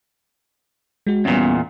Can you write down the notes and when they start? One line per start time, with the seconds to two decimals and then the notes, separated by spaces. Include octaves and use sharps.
1.07 G#3 F#4
1.25 E2 A#2 G3 B3 C#4